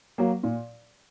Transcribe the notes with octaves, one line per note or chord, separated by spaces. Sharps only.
F#3 A#3
A#2